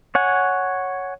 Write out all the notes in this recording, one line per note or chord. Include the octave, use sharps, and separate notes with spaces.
C#5 F#5 G#5